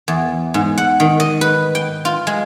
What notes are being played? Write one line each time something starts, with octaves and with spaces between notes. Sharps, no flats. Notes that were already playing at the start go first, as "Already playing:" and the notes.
E2
G#2
F#5
D#3
D#5
B4
G5
F4
G#3